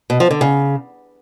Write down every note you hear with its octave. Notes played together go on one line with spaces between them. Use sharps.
B2
F3
D3
C#3